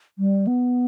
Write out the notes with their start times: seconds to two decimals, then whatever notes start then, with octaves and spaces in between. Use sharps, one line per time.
0.19 G3
0.47 B3